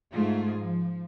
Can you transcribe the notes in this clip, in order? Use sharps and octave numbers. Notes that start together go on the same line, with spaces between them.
G#2 A3 F4 G#4
F3